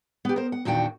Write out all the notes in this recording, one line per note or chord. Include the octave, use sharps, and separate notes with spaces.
B3 G4
A#4 C5
F#5
E2 A#2 D#3 D4 F#4 G5